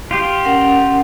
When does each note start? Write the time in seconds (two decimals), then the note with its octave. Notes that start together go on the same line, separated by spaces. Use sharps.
0.11 F4 G4
0.45 C#4 A#4 F#5